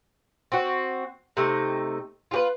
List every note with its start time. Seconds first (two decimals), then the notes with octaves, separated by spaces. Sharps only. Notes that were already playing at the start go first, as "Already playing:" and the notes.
0.52 C4 F#4
1.37 C3 A3 D#4
2.31 F4 G4 B4